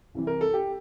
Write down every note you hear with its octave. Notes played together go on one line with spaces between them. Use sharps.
C2 C3 E3
A#4
A4
G4